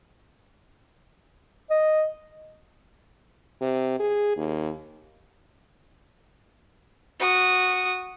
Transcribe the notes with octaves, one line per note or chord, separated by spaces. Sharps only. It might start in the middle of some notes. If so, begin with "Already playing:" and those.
D#5
C3
G#4
D#2
F#4 D#6